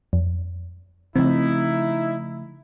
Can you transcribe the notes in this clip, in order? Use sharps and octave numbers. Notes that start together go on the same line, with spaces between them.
F2
C#3 F3 A3 C4 D#4 E4